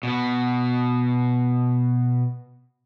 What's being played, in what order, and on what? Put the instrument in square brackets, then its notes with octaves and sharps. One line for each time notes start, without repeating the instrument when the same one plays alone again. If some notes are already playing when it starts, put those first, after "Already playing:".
[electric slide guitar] B2 B3